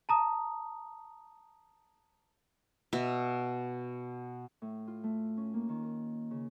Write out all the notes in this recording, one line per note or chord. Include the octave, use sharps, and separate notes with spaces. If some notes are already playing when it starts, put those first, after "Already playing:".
A5 A#5 D#6
B2 E5
A2
F4
A3
C#4
A#3
D#3
A#4
C#3